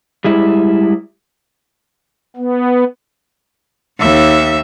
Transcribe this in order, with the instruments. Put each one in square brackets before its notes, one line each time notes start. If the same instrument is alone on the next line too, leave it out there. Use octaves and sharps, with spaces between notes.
[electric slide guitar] G3 G#3 E4
[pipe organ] B3
[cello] D#2 E5